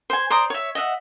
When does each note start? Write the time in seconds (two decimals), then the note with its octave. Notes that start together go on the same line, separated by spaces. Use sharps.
0.10 C5 G#5
0.30 C5 D5 A#5 D#6
0.50 C#5 E5
0.75 D#5 E5 F#5